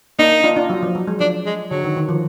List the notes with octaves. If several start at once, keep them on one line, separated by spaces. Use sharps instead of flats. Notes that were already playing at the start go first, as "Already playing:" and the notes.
A#3 D4 D#4
D4 F4
D4 F4
F#3
F3
F#3
G#3
F3 D4
G#3
D3 F#3
D#3
D#3
F3